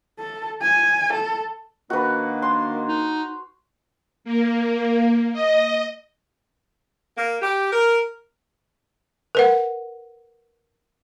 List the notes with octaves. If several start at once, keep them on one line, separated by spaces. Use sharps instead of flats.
A4
G#5
A4
D#3 A#3 D4 F#4 B4
C6
D#4
A#3
D#5
A#3
G4
A#4
A#4 B4 F#5